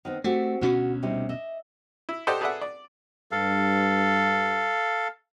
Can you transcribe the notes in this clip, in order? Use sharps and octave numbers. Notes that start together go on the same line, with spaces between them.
D#3 B3 C4
A3 C4 F#4 G4
D2 B2 C#4 F#4
C3 G3 D#4
D#5 E5
E4
G4 A4 C5 D5 D#5 F#5
G#4 A4 B4 D5 E5 F#5
D5
G2 A4 F5